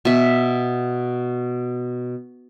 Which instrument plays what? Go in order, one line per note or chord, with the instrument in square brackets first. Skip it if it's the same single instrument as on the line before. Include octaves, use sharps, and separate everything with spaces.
[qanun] B2 E5